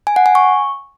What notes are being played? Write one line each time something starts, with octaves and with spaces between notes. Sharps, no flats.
G#5
F#5
G#5
C#6